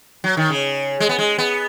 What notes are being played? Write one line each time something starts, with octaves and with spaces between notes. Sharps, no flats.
F#3
D#3
C#3
G#3
B3
G#3
B3